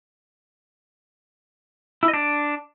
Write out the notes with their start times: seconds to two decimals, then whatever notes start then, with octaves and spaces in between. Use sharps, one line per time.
2.03 E4
2.08 D#5
2.14 D4